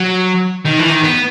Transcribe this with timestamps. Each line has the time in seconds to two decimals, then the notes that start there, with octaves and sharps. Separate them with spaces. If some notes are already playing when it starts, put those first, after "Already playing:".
Already playing: F#3
0.66 D#3
0.79 E3
0.90 D#3
1.02 B3